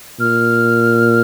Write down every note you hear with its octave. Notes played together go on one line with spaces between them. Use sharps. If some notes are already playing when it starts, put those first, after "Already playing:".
A#2 F6